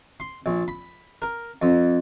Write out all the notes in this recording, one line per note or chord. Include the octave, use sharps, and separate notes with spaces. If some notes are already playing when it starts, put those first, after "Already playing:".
C6
A#1
B5
A#4
F2